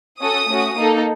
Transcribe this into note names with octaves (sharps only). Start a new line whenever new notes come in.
C#4 F#4 A4 D#6
A3 C#4 F#4
A#3 D#4 A4